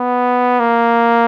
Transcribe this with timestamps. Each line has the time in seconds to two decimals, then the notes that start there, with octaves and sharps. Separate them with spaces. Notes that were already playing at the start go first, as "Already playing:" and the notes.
Already playing: B3
0.60 A#3